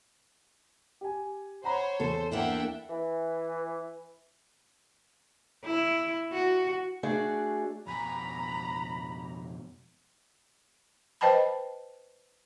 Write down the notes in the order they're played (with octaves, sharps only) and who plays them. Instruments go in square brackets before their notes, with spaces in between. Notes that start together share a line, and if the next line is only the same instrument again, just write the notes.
[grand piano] G4 G#5
[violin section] C5 C#5 [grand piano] F#5 A#5 B5
[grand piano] E2 [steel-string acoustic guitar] A4 [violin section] C5
[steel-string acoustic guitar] A#3 D4 E4 [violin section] E5 F#5 G5
[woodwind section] E3
[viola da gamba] E4
F#4
[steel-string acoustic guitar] A3 D4 F#4 G#4 D5
[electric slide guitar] F2 B2 G#5 [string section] A#5 [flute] B5
[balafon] B4 C5 D#5 G5 A5 B5